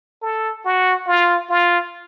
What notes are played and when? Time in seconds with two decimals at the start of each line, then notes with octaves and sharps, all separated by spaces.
0.22 A4
0.65 F#4
1.07 F4
1.49 F4